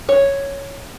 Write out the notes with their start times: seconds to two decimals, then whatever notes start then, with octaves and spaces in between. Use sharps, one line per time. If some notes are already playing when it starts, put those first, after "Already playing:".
0.09 C#5